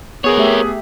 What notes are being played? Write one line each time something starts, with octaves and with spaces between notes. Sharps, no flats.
B3 G#4 A#4 C#5
A3 G4 E5